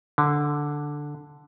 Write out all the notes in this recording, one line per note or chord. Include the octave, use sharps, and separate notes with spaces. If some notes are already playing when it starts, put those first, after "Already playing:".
D3